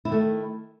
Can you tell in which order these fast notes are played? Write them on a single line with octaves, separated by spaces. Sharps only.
E4 D#3 A3